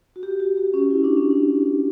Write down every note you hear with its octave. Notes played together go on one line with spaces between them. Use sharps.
F#4
G4
F#4
G4
C#4
E4
D4
C#4
D4